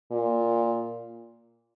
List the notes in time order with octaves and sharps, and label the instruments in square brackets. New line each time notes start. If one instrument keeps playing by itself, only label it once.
[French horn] A#2